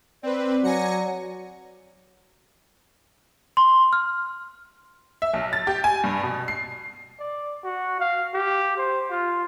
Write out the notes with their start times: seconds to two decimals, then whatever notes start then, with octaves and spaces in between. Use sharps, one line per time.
0.23 C4 B4 D5
0.64 F#3 G#5 A#6 C#7
3.57 C6
3.93 F6
5.22 E5
5.34 B1
5.53 A6
5.67 G4
5.84 G#5
6.04 G2
6.23 B2
6.48 C7
7.19 D5
7.64 F#4
8.00 F5
8.34 G4
8.78 C5
9.10 F4